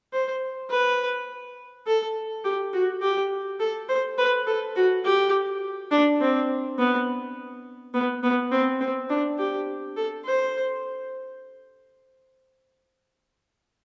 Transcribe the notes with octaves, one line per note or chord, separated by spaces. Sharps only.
C5
B4
A4
G4
F#4
G4
A4
C5
B4
A4
F#4
G4
D4
C4
B3
B3
B3
C4
C4
D4
G4
A4
C5